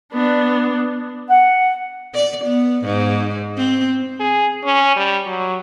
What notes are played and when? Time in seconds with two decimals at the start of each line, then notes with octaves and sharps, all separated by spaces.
0.13 B3 D4
1.29 F#5
2.14 D5
2.45 B3
2.85 G#2
3.57 C4
4.19 G#4
4.64 C#4
4.96 G3
5.26 F#3